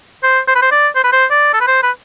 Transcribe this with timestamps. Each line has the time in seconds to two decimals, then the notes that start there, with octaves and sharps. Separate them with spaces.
0.23 C5
0.48 C5
0.55 B4
0.62 C5
0.71 D5
0.95 C5
1.03 B4
1.12 C5
1.31 D5
1.53 A4
1.60 B4
1.67 C5
1.83 B4